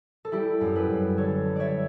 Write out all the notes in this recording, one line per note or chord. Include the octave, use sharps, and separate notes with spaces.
A4
G3 E4 G4
F#2
G4 B4
F#2
D3 A4 C#5
G3
C#5 D5 E5